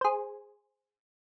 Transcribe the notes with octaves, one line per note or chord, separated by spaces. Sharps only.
G#4 C5